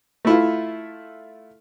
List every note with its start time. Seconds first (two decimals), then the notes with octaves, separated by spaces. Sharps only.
0.25 A3 E4 F4